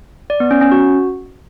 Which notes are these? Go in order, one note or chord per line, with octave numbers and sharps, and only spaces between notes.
D5
B3
C#4
C#4
F#4